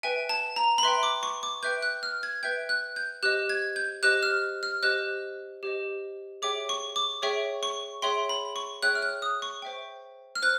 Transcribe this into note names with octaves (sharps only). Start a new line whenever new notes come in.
B4 E5 G5 G#5
A5
A#5
B5
B4 E5 G5 C6
D6
C#6
D6
B4 E5 G5 G6
F#6
F6
G#6
B4 E5 G5 G6
F#6
G6
G4 C5 D#5 F#6
G#6
G6
G4 C5 D#5 F#6
F6
F6
G4 C5 D#5 F#6
G4 C5 D#5
G#4 C#5 E5 G5 D6
C#6
D6
G#4 C#5 E5 G5 C#6
C#6
G#4 C#5 E5 G5 C6
B5
C#6
G#4 C#5 E5 G5 F#6
F6
F#6
D#6
C#6
C5 E5 G5
F6
C5 F#6